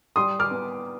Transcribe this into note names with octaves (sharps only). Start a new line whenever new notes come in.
G3 C6 D#6
D6 F6
B3